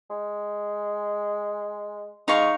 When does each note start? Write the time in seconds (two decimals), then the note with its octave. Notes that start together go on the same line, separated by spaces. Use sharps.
0.10 G#3
2.28 G#3 D#4 F5 C#6